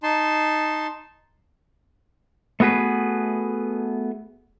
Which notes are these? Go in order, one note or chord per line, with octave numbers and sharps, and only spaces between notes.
D#4 A5 C6
A3 B3 F#4 G#4 B4